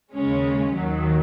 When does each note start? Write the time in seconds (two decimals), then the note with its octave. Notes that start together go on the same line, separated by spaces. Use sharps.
0.13 D#2 C#3 G#3 C#4
0.77 D#2 D#3 F#3